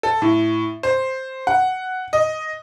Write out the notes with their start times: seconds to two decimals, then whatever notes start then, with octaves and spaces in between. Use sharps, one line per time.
0.03 A4
0.22 A2
0.83 C5
1.47 F#5
2.13 D#5